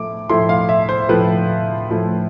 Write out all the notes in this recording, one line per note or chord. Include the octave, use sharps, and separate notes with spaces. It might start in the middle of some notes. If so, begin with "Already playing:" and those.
Already playing: A2 F3 A3 E4 D6
A2 F3 A3 E4 C6
F5
E5
C5
A2 F3 A3 E4 B4
A2 F3 A3 E4